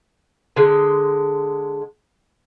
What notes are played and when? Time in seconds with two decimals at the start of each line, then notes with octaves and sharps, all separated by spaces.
0.56 D3 G#3